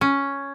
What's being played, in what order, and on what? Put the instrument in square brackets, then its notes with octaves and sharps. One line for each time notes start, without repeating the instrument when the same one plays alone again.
[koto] C#4